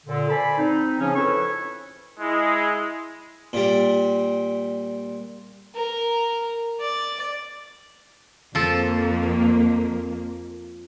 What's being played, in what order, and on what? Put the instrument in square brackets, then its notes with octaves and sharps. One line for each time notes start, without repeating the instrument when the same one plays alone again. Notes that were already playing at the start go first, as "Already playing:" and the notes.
[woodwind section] A#2 D3
A4 C5 D5 G#5 B5
C4 D#4
C#3 F3 C#4
F2 E4 A4 B4 C#5 C#6
[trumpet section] G#3 [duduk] E4
[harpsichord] A#2 G3
[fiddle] A#4
D5
[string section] F2 A#3 [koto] F3 A4